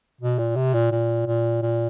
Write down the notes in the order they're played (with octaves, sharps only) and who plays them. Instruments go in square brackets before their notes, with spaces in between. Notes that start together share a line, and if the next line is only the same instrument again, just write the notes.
[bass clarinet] B2
A#2
C3
A#2
A#2
A#2
A#2